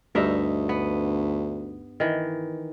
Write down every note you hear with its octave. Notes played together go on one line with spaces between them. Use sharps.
D2 G2 D#4 E5
B3
D#3 E3